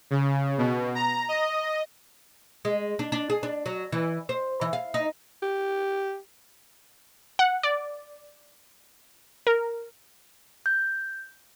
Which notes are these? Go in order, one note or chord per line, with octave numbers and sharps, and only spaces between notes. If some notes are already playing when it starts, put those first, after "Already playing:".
C#3
B2
A#5
D#5
G#3
D4
D4
G#4
D4
F#3
E3
C5
E3
F5
D#4
G4
F#5
D5
A#4
G6